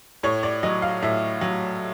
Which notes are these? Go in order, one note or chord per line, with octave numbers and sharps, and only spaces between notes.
A2 C#5
D5
F#3 D#5
F5
A2 E5
F#3